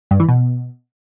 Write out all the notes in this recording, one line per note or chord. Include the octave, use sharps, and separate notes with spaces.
G2
E3
B2